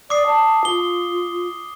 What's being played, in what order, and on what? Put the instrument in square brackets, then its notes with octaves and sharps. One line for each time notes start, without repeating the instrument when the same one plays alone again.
[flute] D5 [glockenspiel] D6 D#6 C7
[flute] A5
[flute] F4 [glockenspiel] G7